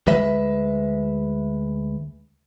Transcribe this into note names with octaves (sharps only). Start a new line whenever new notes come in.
D2 G#3 B4 E5